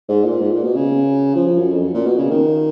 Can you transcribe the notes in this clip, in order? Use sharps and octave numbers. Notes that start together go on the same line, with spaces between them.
G#2
A#2
G#2
A#2
B2
C#3
F3
F3
F#2
F2
F#2
A#2
B2
C#3
D#3